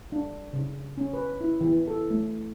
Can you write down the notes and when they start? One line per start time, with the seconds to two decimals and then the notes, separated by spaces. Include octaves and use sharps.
0.12 D4
0.53 C#3
0.98 C#4
1.13 B4
1.41 E4
1.61 E3
1.87 A4
2.10 A3